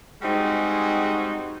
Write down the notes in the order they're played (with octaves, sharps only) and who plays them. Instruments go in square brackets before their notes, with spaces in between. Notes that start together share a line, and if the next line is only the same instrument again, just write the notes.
[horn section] G3 G#3 C4 D#4 F#4 G#4